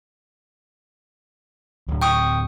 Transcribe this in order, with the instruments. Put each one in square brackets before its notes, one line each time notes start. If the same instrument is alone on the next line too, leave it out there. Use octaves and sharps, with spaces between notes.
[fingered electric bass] D1
[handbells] G5 C#6 D#6